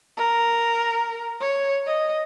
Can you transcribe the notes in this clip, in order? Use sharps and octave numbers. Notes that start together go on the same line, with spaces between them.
A#4
C#5
D#5